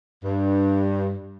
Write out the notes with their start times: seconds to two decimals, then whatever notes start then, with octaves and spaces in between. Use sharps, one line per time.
0.24 G2